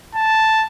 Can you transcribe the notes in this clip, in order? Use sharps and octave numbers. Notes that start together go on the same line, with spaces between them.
A5